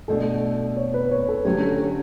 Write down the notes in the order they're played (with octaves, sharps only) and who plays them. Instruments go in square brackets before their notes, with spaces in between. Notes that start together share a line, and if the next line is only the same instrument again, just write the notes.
[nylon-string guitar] B2 A3 D4 [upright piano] A4
[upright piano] C#5
B4
C#5
A4
[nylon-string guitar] D3 F#3 A3 C#4 [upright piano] G4
[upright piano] A4
C#5